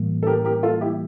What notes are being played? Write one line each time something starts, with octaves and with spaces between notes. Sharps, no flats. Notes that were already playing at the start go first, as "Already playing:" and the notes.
Already playing: A2 E3 G3 A#3
A4
G4 A#4
G4 A#4
F4 A4
E4 G4